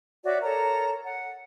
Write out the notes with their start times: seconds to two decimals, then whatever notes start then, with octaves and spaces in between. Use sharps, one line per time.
0.24 F#4 C#5 D5 E5
0.43 A4 A#4 C#5 A#5
1.04 F#5